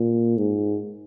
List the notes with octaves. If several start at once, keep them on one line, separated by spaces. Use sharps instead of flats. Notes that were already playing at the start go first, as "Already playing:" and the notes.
Already playing: A#2
G#2